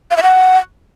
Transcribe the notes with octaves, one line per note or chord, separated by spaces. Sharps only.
F5
E5
F#5